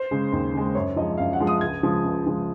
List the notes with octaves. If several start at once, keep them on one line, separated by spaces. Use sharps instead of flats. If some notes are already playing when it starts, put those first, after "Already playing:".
Already playing: C5
C#3 G#3
D#2
C#3 G#3
F#2 C#5
F3 G#3 D#5
F#2 F5
F#5
F3 G#3
D#6
C#2 G#6
C#3 F3 G#3
C#2
C#3 F3 G#3